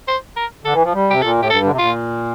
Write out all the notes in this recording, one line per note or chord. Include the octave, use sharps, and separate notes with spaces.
C5
A#4
D3 A4
E3
F3
G3
C3 G4
A#2 A4
A2 G4
G2 A4
D3
C3
A#2 F4